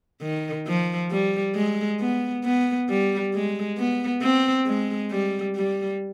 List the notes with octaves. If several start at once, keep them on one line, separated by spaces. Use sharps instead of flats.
D#3
F3
G3
G#3
B3
B3
G3
G#3
B3
C4
G#3
G3
G3